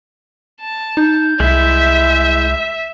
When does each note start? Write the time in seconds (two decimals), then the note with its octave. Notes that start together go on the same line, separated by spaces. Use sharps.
0.61 A5
0.97 D#4 G6
1.40 C2 G#3 E4 E5